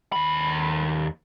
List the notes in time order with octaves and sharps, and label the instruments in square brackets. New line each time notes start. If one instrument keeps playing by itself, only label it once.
[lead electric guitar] D#2 B5